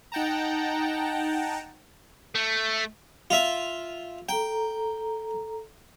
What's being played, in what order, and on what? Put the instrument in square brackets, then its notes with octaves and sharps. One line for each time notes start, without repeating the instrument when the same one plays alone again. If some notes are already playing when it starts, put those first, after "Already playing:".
[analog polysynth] D#4 F#5 G5 A5 A#5
[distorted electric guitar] A3
[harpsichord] F4 E5
[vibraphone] A4 A#5 [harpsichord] G5